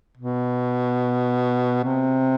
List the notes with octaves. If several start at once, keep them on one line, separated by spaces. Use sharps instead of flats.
B2
C3